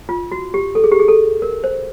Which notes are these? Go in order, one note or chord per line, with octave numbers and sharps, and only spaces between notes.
F4
F#4
G4
A4
G#4
G4
G#4
A4
A#4
C5